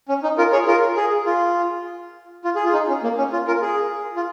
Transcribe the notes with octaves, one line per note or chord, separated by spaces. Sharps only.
C#4
D#4
F4 A#4
G#4 C#5
F4 A#4
G#4
F4
F4
G#4
F4
D#4
C#4
A#3
C#4
F4
F4 A#4
G#4
F4